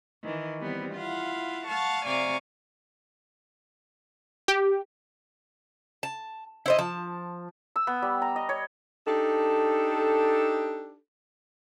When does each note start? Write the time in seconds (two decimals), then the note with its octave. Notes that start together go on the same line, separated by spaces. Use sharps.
0.23 D#3 E3
0.60 E3 G3 B3 C4
0.95 E4 F4 F5 F#5
1.67 F5 F#5 A5 C#6 F6
2.06 C3 D5 F5 G#5 A#5 C#6
4.48 G4
6.03 A5
6.66 E4 C5 D#5
6.79 F3 A5
7.76 E6
7.87 B3
8.02 G3
8.22 A#5
8.36 D#5
8.49 C#5
9.07 D4 D#4 G4 A4